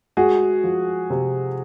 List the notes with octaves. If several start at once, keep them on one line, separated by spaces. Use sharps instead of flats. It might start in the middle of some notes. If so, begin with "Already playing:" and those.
G#3 F#4 G#4
F3
C3